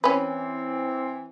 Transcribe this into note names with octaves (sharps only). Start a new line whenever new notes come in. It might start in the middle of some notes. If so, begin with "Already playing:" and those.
E3 C4 C#4 B4